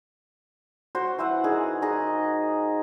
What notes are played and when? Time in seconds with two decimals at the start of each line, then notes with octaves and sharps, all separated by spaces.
0.95 F#4 C5
1.18 E3 C5 E5 F#5
1.44 D#3 G#4
1.82 D#4 G#4 D#5